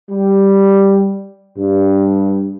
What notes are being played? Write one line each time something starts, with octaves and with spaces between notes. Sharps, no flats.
G3
G2